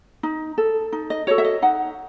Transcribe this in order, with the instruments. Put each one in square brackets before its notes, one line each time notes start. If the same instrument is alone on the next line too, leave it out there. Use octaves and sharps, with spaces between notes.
[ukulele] D#4
A4
D#4
D#5
F#4 A4 C#5
E5
D#5
D#4 F#5